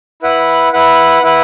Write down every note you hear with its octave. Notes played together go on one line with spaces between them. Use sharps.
E4 B4 F#5
E4 B4 F#5
E4 B4 F#5